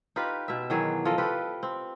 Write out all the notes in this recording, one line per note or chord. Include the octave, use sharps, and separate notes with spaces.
D#4 F4 G4 B4
B2 E5
D#3 E3 F#3 G#4
F3 A4 D#5
F4 G4 A4 B4
C4